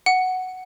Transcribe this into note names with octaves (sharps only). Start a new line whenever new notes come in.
F#5